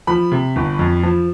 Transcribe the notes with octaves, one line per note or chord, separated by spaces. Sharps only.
F3 B5
C3
G1
F2
F3